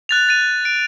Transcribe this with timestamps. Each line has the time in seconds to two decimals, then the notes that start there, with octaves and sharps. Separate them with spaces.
0.09 F#6 A6 F7
0.29 A6 D#7
0.65 D7